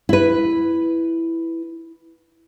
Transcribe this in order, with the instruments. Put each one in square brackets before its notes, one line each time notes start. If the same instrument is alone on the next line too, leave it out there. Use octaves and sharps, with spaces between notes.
[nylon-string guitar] E4 B4